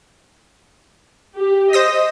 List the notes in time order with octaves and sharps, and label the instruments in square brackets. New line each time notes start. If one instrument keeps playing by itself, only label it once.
[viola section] G4
[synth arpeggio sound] C5 D#6 A#6 [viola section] D#5